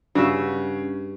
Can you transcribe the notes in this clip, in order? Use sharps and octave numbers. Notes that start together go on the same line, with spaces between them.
G2 C#3 F#4 E5